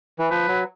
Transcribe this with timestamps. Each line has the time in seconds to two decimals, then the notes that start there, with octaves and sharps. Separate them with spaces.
0.19 E3
0.30 F3 B4
0.47 F#3